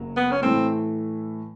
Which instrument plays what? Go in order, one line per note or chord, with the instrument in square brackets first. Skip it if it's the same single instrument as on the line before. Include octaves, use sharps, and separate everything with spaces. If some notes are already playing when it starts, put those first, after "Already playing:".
Already playing: [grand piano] F#1 C#3 F#3 A#3
[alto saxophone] B3
C#4
[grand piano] A2 E3 A3 [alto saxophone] C4